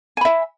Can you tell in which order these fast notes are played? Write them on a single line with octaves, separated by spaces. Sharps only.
G#5 B5 E5